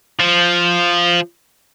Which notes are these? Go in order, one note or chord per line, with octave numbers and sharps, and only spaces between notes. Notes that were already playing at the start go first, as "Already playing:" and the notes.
F3